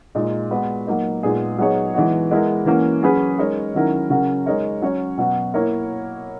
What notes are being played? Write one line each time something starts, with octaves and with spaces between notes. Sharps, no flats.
A#2 G#3 D#4
G#3 B3 F#4 B4
F#3 A#3 D#4
A#2 G#3 B3 D#4 G#4
F#3 B3 D#4 G#4 C#5
E3 G#3 B3 D#4 F#4
G#3 B3 E4 A#4
E3 A#3 C#4 F#4
F#3 C#4 G#4 B4
G#3 D#4 A#4 C#5
D#3 F#3 C#4 E4 A#4
C#3 F#3 C#4 F#4 A#4
G#3 D#4 A#4 C#5
F#3 C#4 F#4 C#5
B2 F#3 B3 F#4
A#3 E4 A#4 C#5